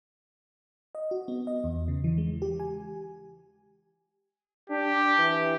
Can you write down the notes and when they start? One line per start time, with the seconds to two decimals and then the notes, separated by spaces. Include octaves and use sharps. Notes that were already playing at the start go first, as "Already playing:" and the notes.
0.95 D#5
1.11 F#4
1.28 B3
1.47 D#5
1.64 E2
1.88 C#3
2.04 E3
2.18 G#3
2.42 G4
2.60 G#5
4.70 D4 G4
5.18 E3